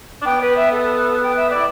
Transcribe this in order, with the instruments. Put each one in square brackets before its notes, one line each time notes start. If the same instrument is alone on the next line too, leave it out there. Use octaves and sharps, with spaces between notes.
[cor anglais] D4
[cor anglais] B3 [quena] G5
[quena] B4
E5
A4
G5
E5
[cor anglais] E4 [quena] D5